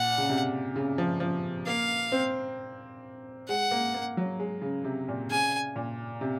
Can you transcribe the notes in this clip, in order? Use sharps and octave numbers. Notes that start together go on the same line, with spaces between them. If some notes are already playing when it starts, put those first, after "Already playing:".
Already playing: A#2 F#5
C#3
C3
C#3
F3
F3
A#3 F5
C4
G#3 F#5
A#3
A#3
F#3
G#3
C#3
C3
A#2
C#3 G#5
A#2
C3